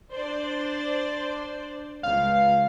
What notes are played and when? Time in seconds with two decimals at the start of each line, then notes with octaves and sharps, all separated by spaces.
0.14 D4 C5 D5
2.03 C#2 F5